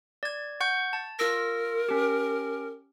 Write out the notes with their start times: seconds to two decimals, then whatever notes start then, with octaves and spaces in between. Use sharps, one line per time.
0.23 D5 G#6
0.60 F#5 C#6 G6
0.93 A5
1.19 F4 A#4 E6 A#6
1.89 C#4 G4